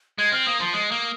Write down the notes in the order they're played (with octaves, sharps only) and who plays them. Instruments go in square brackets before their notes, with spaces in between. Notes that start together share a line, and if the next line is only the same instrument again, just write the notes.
[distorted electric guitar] G#3 [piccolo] G#6
[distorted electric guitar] C4 [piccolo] F6
[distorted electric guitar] A#3 [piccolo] D#6
[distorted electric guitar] F3 [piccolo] C6
[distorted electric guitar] G#3 [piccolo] D#6
[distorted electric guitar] A#3